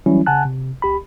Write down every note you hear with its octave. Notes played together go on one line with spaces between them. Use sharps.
E3 F#3 G3 C#4 E4
C#3 F#5 G#5 A5 F#6
C3
C#2 G4 B5